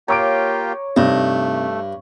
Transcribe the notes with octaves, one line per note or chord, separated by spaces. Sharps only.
A#3 F4 G4 C#5 A#5 D6 D7
G2 C3 A3 D#4